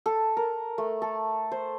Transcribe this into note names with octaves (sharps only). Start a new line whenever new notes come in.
A4
A#4
A3
A4
C5